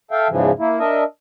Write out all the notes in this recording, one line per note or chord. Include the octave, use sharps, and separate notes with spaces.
A4 E5 F5 G5
E2 G#2 C#3 E3 F3
A#3 E4
D4 A#4 D#5 E5